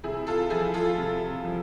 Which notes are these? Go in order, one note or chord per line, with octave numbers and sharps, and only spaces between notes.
C3 E4 G#4
F4 A4
F3 E4 G#4
F4 A4
C3
F3